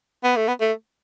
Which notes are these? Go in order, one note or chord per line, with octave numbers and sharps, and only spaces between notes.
B3
A3
B3
A3